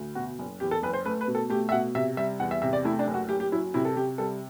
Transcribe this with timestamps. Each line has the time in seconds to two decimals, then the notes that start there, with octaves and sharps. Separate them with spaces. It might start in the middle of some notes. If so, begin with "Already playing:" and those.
Already playing: D2
0.15 B2 F#4
0.39 F#1
0.60 E2 G4
0.71 A4
0.83 F#1 B4
0.93 C5
1.05 A3 B4
1.21 B4
1.28 B2
1.35 A4
1.50 A3 G4
1.69 E5
1.72 B2 F#5
1.95 C3 E5
2.17 G3 E5
2.40 E2 F#5
2.51 E5
2.62 C3 E5
2.73 D5
2.85 A3 E4
2.99 D4
3.07 F#1
3.14 F#4
3.29 F#1 G4
3.40 G4
3.52 F#3 E4
3.74 C3 E4
3.85 A4
3.96 C3 G4
4.18 G3 A4